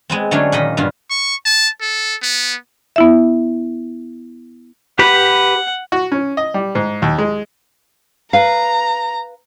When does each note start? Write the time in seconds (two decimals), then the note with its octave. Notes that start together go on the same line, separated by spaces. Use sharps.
0.10 G#3 B3 C4
0.31 D3 F#3 A3 C#4 D4 G#4
0.52 A#2 D#3 D#5 B5
0.77 G2 D3 B3 F4
1.10 C#6
1.45 A5
1.81 A4
2.22 B3
2.96 B3 E4 E5
4.99 G4 B4 F#5 B5
5.92 F#4
6.12 C#4
6.37 D#5
6.54 G3
6.75 G#2
7.02 D#2
7.18 G#3
8.33 B4 F5 A#5